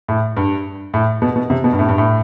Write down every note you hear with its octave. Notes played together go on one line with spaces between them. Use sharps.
A2
G2
A2
B2
B2
C3
B2
G2
A2
G2
A2